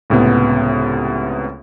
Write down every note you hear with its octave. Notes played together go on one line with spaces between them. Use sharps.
C#2 A2 C3 B3